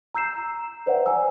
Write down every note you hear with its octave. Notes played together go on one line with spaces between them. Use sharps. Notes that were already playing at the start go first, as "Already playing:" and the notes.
A#5 E6 G6 C7 E7
B4 C5 D5 E5 F#5 G5
G#5 A#5 E6